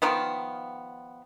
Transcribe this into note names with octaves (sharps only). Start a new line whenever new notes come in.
D#3 F3 B3